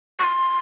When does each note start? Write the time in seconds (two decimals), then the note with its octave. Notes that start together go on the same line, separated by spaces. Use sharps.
0.19 C#6
0.24 C6